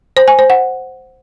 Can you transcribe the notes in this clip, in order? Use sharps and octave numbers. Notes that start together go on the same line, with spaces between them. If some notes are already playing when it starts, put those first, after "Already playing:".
C5
G#5
C5
F#5